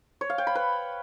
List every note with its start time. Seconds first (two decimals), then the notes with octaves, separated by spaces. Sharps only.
0.21 C#5
0.30 F5
0.38 G5
0.47 B5
0.55 B4